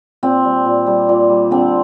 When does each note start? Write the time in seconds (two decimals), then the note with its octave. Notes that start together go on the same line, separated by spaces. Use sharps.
0.23 A#2 C4
0.45 G3
0.66 A#2
0.87 G3
1.09 A#2
1.30 G3
1.51 D3 C4